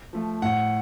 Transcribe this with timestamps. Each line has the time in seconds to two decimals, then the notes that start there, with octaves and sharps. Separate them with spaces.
0.13 F3 A3
0.42 A2 F#5